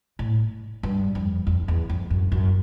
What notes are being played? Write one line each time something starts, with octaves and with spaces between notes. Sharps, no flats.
A2
G2
F2
F2
E2
F2
F#2
F#2